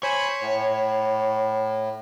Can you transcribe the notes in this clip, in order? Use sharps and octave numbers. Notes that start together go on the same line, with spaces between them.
C5 C#5 G#5 B5
A2